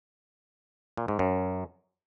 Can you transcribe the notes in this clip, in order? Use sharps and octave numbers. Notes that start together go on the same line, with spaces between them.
A#2
G#2
F#2